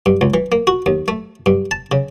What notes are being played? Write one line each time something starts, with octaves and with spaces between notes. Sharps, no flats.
G2
C#2
E3
A#3
F#4
D#2
A3
G2
A5
C#3